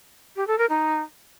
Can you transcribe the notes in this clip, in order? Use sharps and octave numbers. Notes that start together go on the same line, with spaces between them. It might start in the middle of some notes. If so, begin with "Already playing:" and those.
G4
A4
A#4
D#4